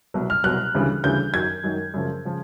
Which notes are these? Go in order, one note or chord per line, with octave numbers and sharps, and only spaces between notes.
C2 B2 F#3
F6
C2 B2 F#3 F#6
D2 C#3 E3 G3
D2 C#3 E3 G3 G6
F#2 D#3 F#3 G#6
F#2 D#3 F#3
F#2 C#3 F3
C#3 F3